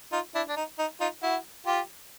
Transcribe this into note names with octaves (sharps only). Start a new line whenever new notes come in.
D#4 F4
D4 E4
D4
D#4
D#4
D#4 F4
E4 F#4
F4 G4